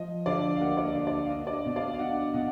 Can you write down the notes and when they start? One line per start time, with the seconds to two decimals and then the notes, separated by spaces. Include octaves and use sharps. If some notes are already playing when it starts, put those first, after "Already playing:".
Already playing: F3 D#5
0.26 D3 D5 F5
0.56 F5
0.61 A#3 D#5 F#5
0.77 D5
0.84 D#5
0.95 D3 D#5
1.07 D5
1.25 F5
1.30 D4 D#5
1.47 D5
1.53 D#5
1.65 B2
1.76 D5 F5
1.94 F5
1.99 D4 D#5 F#5
2.34 B2 D#5 F#5